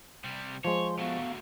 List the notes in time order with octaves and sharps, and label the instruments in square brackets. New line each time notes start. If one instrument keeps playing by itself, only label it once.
[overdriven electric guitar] C3 G3
[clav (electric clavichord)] F3 G#3 [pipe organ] C5 C6 [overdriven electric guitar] C#5
[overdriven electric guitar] F#3 A3 [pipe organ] B3 F5